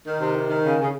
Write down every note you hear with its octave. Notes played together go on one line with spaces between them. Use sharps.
D#3
C3
D#3
D#3
C#3
C#3